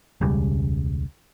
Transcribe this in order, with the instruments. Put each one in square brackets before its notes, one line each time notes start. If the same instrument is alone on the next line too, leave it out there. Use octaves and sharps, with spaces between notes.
[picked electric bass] E1 C#2 C#3 G3